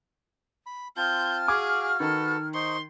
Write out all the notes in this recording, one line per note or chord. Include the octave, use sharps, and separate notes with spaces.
B5
C4 F4 A5 F6 G6
F#4 G#4 F5 G#5 D6 G#6
D#3 F#4 A4 B4
D#4 C5 C6 C#6